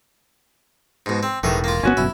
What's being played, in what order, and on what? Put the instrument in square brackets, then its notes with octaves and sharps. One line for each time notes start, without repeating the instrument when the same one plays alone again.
[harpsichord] G#2 B2
C4
[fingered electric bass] E1 [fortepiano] A2 [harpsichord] D#3 E3 G#4
[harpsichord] A#3 F4
[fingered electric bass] G1 B3 [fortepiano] C#4 F#4
[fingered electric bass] G1 F#2 B2 [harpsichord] E4